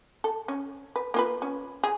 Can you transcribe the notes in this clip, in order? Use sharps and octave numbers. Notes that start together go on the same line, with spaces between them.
A4
C#4
B4
A#3 F4 B4
C#4
G#4